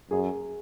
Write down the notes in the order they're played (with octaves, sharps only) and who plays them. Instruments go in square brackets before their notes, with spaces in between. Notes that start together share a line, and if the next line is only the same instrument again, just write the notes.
[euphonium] F#2 [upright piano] G#4